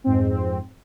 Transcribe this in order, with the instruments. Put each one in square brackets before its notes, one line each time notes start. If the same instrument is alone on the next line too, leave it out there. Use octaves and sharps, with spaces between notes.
[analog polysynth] F2 G#2 C4